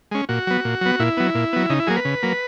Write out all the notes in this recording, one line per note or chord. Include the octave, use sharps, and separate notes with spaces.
G#3 C#4
A#2 F#4
F#3 B3
A#2
F#3 B3
A#2 E4
F#3 B3
A#2
F#3 B3
C#3 D#4
E4
F#3 A#3 G#4
B4
C#3
F#3 A#3